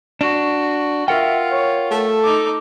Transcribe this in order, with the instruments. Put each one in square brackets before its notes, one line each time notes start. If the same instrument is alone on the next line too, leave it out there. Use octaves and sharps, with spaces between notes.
[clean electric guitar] D4 [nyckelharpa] F#4
[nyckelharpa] F4 [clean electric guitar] A#4 F#5 G5 [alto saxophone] E5
[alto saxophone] C#5
[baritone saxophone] A3 [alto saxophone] A4
[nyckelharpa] D#4 D6